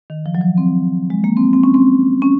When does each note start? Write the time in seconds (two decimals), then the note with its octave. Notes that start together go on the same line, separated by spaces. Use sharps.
0.10 D#3
0.26 F3
0.35 F#3
0.41 F3
0.58 C4
1.10 G#3
1.24 A#3
1.37 C4
1.53 C4
1.64 C#4
1.74 C4
2.22 C#4